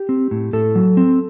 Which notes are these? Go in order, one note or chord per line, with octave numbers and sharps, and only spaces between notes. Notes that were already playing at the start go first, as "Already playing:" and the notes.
Already playing: G4
C4
A2
A2 A4
F#3
C4